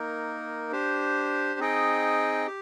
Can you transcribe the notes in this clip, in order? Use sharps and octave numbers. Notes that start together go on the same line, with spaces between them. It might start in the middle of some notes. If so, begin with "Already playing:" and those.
Already playing: A#3 D#4 A#4
D4 G4 C5
C4 D#4 G#4 D#5 G5
G4